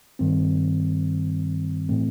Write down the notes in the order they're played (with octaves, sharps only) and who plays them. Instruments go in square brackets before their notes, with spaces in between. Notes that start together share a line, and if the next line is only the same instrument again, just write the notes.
[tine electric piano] G2 D#3 G3 C4
A2 E3 A3 C4